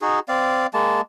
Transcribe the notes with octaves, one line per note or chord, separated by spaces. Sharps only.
D#4 F#4 G#4
C4 D5 F5
G#3 A#3 A5